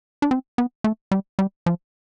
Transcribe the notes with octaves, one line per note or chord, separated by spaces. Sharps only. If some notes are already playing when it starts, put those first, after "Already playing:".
D4
C4
B3
A3
G3
G3
F3